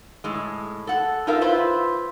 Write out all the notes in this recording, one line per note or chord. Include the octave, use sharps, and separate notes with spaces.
A2 G#3
A4 F#5
D#4 F4 A4 A#4 E5 F5
E4 F4 B4 C5